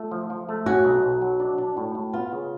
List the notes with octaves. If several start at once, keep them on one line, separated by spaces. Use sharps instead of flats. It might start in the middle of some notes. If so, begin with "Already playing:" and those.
Already playing: A3 F4
F3
F3
A3
C#4 F#4
B1
B1
F#3
D4
D4
A2
A2
B3 F4
C#3